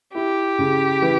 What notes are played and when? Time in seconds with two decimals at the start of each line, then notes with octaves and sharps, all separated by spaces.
0.15 E4 G4
0.58 C#3
1.02 E3